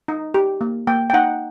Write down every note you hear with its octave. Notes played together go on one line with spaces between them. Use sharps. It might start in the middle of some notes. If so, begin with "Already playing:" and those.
D#4
G4
A#3
A#3 G5
G5
D#4 F#5